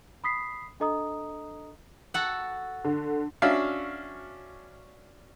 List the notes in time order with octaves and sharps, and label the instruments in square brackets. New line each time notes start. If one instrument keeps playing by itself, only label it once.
[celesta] B5 D#6 B6 C7
D4 A4 D#5 A#5 D#6
[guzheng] F#4 A4 F#5
[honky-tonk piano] D3
[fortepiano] C#4 D4 F#4 E5 F5